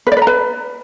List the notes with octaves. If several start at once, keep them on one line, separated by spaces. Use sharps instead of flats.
B4
D5
B4
A#5
B4